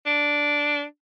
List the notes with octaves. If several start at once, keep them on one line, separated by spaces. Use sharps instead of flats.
D4